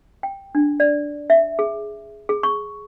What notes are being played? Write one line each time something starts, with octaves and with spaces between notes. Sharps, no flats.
G5
D4
D5
E5
G#4
G#4
C#6